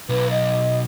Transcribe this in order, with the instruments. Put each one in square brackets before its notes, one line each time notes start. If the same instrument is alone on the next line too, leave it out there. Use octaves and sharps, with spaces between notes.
[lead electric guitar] B1 [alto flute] B4
[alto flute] D#5